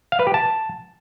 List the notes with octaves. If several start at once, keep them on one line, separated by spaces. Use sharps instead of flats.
F5
B4
G4
A5